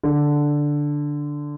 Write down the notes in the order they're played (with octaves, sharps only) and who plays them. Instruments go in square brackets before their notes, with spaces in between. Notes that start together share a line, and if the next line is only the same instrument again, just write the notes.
[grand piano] D3